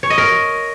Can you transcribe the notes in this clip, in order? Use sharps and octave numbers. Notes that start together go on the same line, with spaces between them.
C#5
D#5
A#4